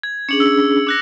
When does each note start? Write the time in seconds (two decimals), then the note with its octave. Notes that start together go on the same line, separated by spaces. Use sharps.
0.03 G#6
0.29 C#4 D4 G#4 C#7 F#7
0.40 E6
0.87 D6 F#6 A#6